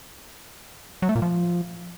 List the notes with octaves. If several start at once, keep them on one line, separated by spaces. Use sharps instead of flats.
F#3
A3
A#2
F3